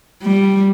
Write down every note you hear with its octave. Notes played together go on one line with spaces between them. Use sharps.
G3